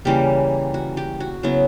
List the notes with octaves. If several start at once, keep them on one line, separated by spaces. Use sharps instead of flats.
C#3 E3 G3 A#3 G4
F#4
G4
F#4
C#3 F#3 B3 E4